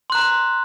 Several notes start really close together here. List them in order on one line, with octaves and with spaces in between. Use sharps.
C6 F#6 A#5